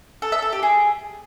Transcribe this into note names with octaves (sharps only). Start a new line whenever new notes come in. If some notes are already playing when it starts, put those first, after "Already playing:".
A4
E5
A4
G4
G#4